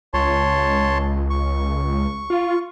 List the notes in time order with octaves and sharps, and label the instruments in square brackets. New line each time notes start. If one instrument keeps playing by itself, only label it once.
[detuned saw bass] C#2 [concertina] C#5 A5 C6
[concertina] C#6
[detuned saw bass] F4